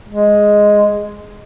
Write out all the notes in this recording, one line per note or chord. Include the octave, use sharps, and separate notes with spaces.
G#3